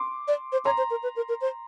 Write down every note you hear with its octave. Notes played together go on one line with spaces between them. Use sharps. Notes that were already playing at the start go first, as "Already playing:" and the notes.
Already playing: C6 D6
D5
C5
C#5 A#5 C6
C5
A#4
B4
A#4
A#4
C5